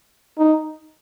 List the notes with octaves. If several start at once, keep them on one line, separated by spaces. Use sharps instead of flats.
D#4